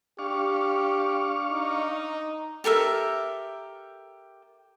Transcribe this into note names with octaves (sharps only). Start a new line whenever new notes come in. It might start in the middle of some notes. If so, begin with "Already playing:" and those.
D4 G4 F5 C#6
D#4
G4 A4 A#4 E5